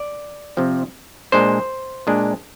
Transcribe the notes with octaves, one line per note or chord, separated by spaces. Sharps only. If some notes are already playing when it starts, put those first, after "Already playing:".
Already playing: D5
C3 F3 C4
A#2 G#3 D4 C5
A#2 G#3 D4